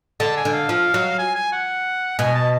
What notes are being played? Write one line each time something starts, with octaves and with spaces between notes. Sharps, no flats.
D3 A5
G#5
D3
F5
F3
F#3
G#5
G#5
F#5
B2 G#5
A5